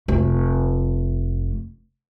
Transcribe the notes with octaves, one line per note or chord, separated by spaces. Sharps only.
F1 A3